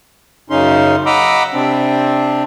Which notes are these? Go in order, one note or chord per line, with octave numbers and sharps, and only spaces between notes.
F#2 C#3 C#4 D#4 C6
D#5 F#5 A#5 B5 D6 E6
C3 C4 D4